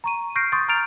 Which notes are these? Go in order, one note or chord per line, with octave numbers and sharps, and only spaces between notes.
A#5 C#6 D#7
C#6 F6 G6 A#6 C7 D7
C6 C#6 D#6 G6 A6
A#5 F6 G6 A6 D7 F7